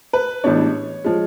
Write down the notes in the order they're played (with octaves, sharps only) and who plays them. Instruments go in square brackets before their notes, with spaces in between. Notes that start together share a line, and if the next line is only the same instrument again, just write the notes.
[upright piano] B4
A1 A2 G#3 B3 D4 C#5
F3 G#3